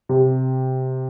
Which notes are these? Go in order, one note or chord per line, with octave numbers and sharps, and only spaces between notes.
C3